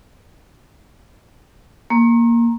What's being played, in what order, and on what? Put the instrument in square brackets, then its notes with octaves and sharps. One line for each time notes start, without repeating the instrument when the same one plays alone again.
[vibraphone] A#3